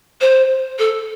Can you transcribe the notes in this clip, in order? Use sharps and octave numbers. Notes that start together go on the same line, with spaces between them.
C5
A4